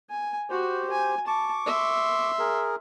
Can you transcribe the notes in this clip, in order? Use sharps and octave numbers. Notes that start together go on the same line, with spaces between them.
G#5
F#4 G4 C5
G#5
A5 C#6 D6
E5 C6
G#4 A#4